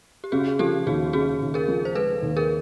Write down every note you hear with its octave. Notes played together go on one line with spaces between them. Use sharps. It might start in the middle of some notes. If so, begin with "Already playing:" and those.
G4
C#3 F#4 G#4
F3 G4 A4
D#2 F#4 G#4
C#3 F#4 G#4
D#2
G#4 A#4
F3
C5
G#3 A4 B4
D#2
G#4 A#4